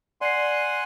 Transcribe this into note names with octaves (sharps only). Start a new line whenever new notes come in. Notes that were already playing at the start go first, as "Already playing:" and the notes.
D5 F#5 G#5 C6 C7